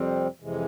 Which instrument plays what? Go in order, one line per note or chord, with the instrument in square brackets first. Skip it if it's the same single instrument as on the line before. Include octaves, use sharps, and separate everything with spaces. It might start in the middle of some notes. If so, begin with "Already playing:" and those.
Already playing: [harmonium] F2 C3 G3 C4
F2 C3 E3 G#3